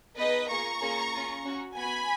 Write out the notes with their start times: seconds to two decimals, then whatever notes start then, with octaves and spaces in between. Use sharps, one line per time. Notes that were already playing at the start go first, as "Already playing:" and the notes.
0.17 B3 D#4 G#4 B4 D#5
0.49 A#3 F4 G#4 A#5 C#6
0.81 A#3 C#4 F4 G#4
1.13 C#4 F4 G#4
1.45 C#4 F#4
1.77 B3 F#4 G#5 B5